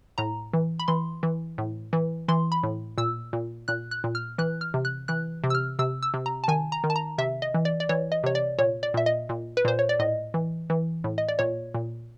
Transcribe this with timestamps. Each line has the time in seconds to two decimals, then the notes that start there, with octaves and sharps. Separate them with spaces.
0.18 A2 A#5
0.53 E3
0.79 B5
0.88 E3 C6
1.23 E3
1.58 A2
1.93 E3
2.28 E3 C6
2.52 B5
2.63 A2
2.98 A#2 E6
3.33 A#2
3.68 A#2 F#6
3.91 F#6
4.04 A#2
4.15 F6
4.38 E3 F#6
4.61 F6
4.74 C3
4.85 F#6
5.08 E3 F#6
5.44 C3
5.50 E6
5.55 F6
5.79 C3 E6
6.03 E6
6.14 C3
6.26 A#5
6.44 A5
6.48 D#3 G#5
6.72 A#5
6.84 D#3
6.90 A5
6.96 A#5
7.18 C3 E5
7.42 D#5
7.54 E3
7.65 D5
7.80 D5
7.89 E3 C#5
8.12 D#5
8.23 C3 C#5
8.35 D5
8.58 A#2 C#5
8.83 D5
8.94 A#2 E5
9.06 D#5
9.29 A#2
9.57 B4
9.65 A#2 C5
9.79 C#5
9.89 D5
9.99 A2 D#5
10.34 E3
10.70 E3
11.04 A2
11.18 D#5
11.29 D5
11.39 A#2 C#5
11.74 A#2